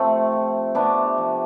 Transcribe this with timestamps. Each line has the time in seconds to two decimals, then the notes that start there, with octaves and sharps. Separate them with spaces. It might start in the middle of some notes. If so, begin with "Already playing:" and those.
Already playing: C3 F3 A3 C4
0.32 F3
0.75 C3 B3 D4
1.18 F3